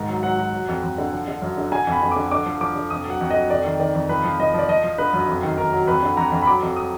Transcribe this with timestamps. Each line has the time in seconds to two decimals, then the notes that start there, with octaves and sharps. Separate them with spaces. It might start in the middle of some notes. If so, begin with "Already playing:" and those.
Already playing: G#2 D#3
0.09 F#3
0.23 F#3 F#5
0.38 F#3
0.53 F#3
0.68 F2
0.83 F2
0.98 D3
1.13 F3
1.28 D3
1.42 F#2
1.57 D3
1.72 D3 G#5
1.87 F2
1.92 B5
2.02 F2
2.11 D3 D6
2.31 D3 D6
2.46 F3
2.61 F3 D6
2.76 D3
2.90 F2 D#6
3.06 F#3 F#5
3.21 F2
3.30 F#3 D#5
3.50 F2 D5
3.65 D#3
3.80 D#3 D5
3.95 F2
4.09 F3 B4
4.24 F3
4.39 F3 D#5
4.54 F3 D5
4.68 F3 D#5
4.84 F3
4.98 D3 B4
5.13 F#2
5.28 F2
5.43 D#3
5.58 D#3 A#4
5.73 F#3
5.87 F2 B4
6.02 D3
6.17 F2 A#5
6.32 F2
6.42 B5
6.47 F#3 D6
6.62 F2
6.76 D#6